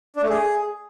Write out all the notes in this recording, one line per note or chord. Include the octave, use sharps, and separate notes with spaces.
D4
A3
G#4